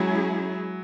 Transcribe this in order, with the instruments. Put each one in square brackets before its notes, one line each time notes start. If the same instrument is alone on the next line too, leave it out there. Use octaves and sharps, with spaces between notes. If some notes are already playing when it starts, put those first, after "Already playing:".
Already playing: [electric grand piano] F#3 [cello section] G#3 C#4 E4 G#4